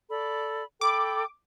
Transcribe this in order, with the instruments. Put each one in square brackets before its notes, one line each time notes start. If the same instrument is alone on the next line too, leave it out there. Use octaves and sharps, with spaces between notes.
[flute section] A4 D5 B5
[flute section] A4 G5 B5 [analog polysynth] D6